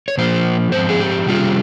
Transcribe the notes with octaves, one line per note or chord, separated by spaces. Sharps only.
C#5
A#2 F3 A#3 F4 C5
G#2 F3 C4 C5
G#4
G4
C3 G3 C#4 F4